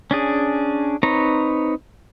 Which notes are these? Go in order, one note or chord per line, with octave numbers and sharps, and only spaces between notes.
C#4 D4 G#4
C4 D#4 B4 C#5 A#5